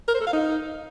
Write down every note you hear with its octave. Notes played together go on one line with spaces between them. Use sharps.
A#4
C5
A4
F5
D#4